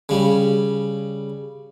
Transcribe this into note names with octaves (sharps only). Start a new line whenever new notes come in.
C#3 G3